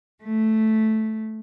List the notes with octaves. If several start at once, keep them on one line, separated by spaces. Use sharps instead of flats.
A3